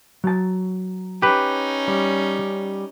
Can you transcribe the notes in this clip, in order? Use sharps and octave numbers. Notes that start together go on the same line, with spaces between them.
F#3 A5
C#4 D#4 G4 B4
G3